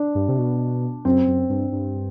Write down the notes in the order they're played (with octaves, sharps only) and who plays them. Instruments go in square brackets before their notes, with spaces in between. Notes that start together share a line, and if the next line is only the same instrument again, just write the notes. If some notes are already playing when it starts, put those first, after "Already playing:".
Already playing: [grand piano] D4
[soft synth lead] G2
C3
B2
[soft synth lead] F#2 [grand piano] C4
[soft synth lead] F#2
G2
G2